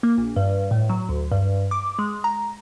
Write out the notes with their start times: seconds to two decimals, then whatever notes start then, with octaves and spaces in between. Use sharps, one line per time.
0.03 A#3
0.18 A#1
0.36 G2
0.71 A2
0.89 F#3
1.09 D2
1.32 G2
1.71 D6
1.99 G#3
2.24 A#5